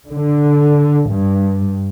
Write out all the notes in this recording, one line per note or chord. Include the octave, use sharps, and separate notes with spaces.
D3
G2